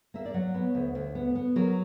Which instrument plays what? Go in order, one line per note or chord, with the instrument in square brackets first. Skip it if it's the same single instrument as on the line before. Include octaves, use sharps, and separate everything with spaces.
[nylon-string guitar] A#3 E5
D5
F#3 C#5
B3
D2
D2
B3
B3
F#3 A#4